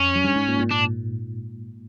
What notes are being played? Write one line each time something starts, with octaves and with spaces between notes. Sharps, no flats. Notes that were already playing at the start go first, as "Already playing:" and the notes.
Already playing: F2 C#4
F#2
G2
G#2
A#2
A#2
A#2 D4